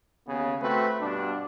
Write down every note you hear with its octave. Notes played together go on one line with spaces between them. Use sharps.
D#2 C#3 B3
A3 C4 F#4 B4
G2 B2 D4